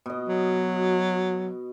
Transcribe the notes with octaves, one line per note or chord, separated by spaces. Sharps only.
B2 D#5
F#3